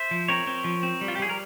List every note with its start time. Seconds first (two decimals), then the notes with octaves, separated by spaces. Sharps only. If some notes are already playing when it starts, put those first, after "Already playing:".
Already playing: C5 E5
0.11 F3
0.28 C4 A#4 C#5
0.47 C4
0.64 F3
0.83 C4
1.01 G3
1.08 F4
1.15 G4
1.19 G3 G#4
1.29 A#4